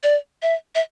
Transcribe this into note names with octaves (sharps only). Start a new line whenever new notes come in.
D5
E5
E5